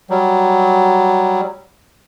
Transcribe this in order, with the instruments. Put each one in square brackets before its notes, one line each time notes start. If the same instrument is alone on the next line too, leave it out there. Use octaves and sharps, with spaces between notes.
[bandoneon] F#3 G3